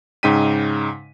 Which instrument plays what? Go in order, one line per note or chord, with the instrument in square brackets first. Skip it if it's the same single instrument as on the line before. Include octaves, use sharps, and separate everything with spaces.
[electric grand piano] G#2 C#3 D#4 G5 B6 D#7